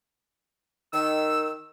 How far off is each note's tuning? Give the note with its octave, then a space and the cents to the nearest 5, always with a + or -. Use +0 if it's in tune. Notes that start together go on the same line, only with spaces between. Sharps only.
D#3 -10 E6 +0